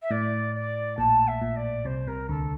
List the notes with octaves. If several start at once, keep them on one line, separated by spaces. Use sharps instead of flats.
E5
A2 D5
D5
A#1 A#2 A5
E5
A#1 A#2
D5
C2 C3 C5
C2 C3 A#4
D2 D3 A4